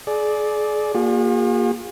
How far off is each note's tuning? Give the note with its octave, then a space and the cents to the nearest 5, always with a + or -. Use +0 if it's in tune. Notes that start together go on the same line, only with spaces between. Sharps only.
G#4 +35 D5 +0
A#3 +0 F4 +45 G#4 -40